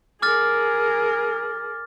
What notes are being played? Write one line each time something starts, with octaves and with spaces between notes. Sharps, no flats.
G#4 A#4 D6 F6 A6